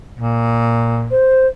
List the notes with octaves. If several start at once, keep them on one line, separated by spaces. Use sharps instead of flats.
A#2
C5